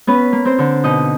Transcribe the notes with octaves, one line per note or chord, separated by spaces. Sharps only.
B3 C#4 B4
A#3
C4 C5
D3
B2 D#4 D#5